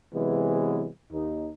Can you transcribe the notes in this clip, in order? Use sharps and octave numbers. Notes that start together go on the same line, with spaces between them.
C3 E3 F#3 G#3 B3
D#2 D#4